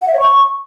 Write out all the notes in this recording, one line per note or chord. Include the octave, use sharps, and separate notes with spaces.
F#5
E5
C#5
C#6